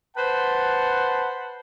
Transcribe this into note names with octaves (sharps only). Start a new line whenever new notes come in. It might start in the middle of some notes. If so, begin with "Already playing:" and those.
B4 C5 F#5 A5